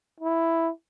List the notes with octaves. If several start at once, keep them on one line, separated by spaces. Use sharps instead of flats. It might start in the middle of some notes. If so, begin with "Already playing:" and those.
E4